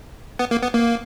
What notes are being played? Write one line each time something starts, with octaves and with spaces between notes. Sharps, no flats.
B3
A#3
B3
A#3